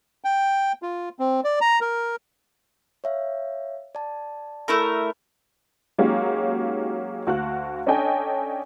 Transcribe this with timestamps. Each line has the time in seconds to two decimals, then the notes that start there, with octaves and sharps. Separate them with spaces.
0.24 G5
0.82 F4
1.19 C4
1.44 D5
1.61 A#5
1.81 A#4
3.04 C#5 E5 F5
3.95 D5 A5
4.68 A3 E4 A#4
5.98 F#3 G#3 A#3 C#4 D#4 G4
7.27 D2 F#4 F5 F#6
7.87 C#4 D4 A4 D#5 G5 G#5